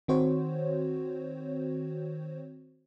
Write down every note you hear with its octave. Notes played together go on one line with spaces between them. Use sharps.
D#3 C4 F#4 C5 C#5